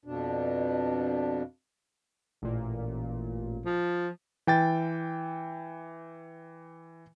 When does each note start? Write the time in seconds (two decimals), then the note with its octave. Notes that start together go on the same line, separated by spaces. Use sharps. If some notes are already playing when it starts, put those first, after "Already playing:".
0.05 F2 B2 D4
2.42 A1 A#2
3.66 F3
4.47 E3 G5 A6